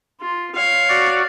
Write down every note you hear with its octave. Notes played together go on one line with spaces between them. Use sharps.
F4
C#5 F5
F#4 D5